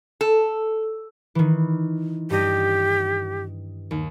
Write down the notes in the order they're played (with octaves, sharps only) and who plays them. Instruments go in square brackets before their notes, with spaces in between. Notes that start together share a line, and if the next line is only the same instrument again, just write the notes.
[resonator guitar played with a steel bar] A4
[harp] D#3 E3
[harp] G2 D#5 A#6 [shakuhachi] G4
[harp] D#2